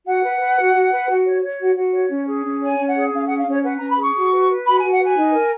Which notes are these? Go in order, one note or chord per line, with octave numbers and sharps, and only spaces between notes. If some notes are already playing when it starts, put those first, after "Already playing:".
F#4 F#5
B4
B4
F#4
F#4
B4
F#4
C#5
C#5
F#4
F#4
C#5
C#4
G#4
C#4
C#5 G#5
C#4
F#5
G#4
C#4 F5
G#4 F#5
F5
C#4 C#5
B4 F#5
A#5
C#4
B5
G#4 C#6
F#4
B4
B4
F#4 B5
F#4 G#5
F#5
B4 G#5
D#4
A#4